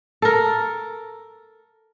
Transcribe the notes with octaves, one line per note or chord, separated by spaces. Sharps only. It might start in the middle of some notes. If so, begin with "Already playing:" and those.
A4 A#4